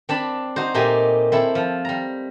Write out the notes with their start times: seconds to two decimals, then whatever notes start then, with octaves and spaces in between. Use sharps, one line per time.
0.09 C4 D4 A5 B5
0.56 D#4 F#4 C5
0.74 A#2 A3 D#4 G4 D#5 G#5
1.32 C4 E4 A4
1.55 F3
1.85 G3 A#5